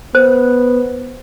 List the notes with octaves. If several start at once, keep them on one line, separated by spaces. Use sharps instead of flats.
B3 C5